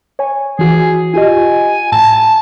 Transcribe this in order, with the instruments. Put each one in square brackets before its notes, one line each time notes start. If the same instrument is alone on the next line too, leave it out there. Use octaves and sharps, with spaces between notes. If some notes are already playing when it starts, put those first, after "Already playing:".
[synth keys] C#5 G#5
[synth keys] E3 F#4 [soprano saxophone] G#4
[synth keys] F4 G4 D#5 [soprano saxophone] G#5
[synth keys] A2 [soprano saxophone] A5